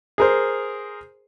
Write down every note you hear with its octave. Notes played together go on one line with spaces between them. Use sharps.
G#4 A#4 C5